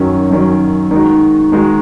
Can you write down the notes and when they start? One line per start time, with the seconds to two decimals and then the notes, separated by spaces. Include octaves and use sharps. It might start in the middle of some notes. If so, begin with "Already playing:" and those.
Already playing: F#2 D#3 F#3 C#4
0.31 F#2 D#3 F#3 C#4
0.91 D#3 G#3 D#4 F#4
1.52 D#3 G#3 D#4 F#4